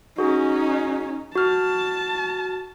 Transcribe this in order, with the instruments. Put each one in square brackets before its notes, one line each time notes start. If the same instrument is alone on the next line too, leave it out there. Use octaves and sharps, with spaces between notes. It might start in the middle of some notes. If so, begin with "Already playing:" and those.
[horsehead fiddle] C#4 D#4 [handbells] F#4 G#4
[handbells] F#4 F6 [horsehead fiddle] A5